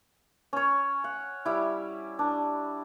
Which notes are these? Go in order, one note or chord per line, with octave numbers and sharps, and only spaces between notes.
C#4 C#5
F#5
G3 E4
D4